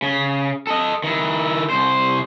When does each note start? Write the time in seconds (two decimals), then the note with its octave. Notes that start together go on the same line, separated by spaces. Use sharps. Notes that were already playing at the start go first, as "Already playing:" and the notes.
0.02 C#3
0.67 A4 D#5
1.04 D#3 E4
1.70 C2 C5